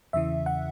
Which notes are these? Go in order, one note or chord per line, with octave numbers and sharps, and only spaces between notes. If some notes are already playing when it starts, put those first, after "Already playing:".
E2 C#3 E3 E5
F#5